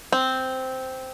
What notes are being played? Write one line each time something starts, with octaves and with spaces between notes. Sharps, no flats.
C4